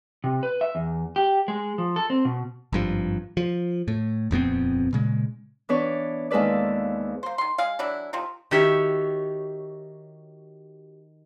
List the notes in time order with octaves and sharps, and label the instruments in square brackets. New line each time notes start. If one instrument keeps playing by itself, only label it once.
[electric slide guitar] C3
B4
E5
E2
G4
G#3
F3
A4
C4
B2
[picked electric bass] G#1 G2 F3
F3
A2
D#1 F2 B3 C4
A#2 C#3 G#3
[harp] E3 B3 D4 B4 C#5 D5
D#2 G#3 F4 A4 B4 D5
[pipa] A#3 C5
D#3 C6
G#3 G#4 F5
E3 F#3 D4 E4
C3 D#3 F3
[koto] D#3 F#4 G4 C#5 E5